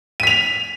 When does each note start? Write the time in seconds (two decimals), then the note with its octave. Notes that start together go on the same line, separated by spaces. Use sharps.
0.20 D#7
0.23 B6
0.27 F7